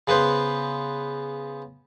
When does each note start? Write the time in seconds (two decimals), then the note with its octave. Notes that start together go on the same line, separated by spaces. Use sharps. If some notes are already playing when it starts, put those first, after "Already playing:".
0.07 C#3 B3 B4 C5